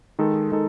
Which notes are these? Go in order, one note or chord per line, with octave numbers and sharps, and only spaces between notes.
D#3 G#3 D#4 A4
D#3 G#3 D#4 A4